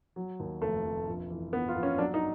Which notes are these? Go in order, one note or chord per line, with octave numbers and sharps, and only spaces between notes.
F#3
D#2
F1 A3
F1
A#1
E3
A#1 B3
F4
A#1
C#4
F#3 D4
D#4